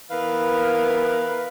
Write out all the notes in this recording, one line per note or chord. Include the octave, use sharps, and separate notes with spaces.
E3 B3 A#4 B4 F5